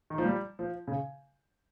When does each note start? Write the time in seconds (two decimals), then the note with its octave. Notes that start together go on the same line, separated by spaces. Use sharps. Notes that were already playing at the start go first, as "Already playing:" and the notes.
0.10 D#3
0.18 F3
0.25 G3
0.59 F3
0.87 C#3